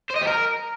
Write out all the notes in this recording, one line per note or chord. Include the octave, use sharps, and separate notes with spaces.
C5
D#5
G4
A#4